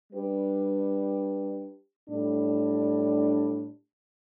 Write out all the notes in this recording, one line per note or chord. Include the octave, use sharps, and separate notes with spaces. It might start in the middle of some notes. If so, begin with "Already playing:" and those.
G3 D4 G4 B4
A2 G3 D4